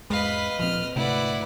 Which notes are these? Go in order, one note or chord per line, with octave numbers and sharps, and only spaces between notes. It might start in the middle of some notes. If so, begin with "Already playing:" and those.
E2 G#2 G#3 B4 D#5 F5 B5
D1 A#2 F3 C4 F6
D2 G#2 C3 A3 E4 B4 D5 F#5